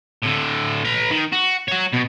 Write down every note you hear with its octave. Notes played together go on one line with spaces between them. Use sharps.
A2 D3
B4 A#5
D#3
F#4
F#4 C#5
B2